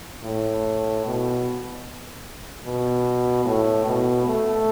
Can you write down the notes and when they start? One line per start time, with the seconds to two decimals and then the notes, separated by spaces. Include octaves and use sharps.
0.24 A2
1.05 B2
2.65 B2
3.45 A2
3.85 B2
4.26 A3